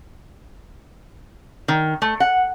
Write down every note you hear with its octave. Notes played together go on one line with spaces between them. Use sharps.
D#3
A3
F#5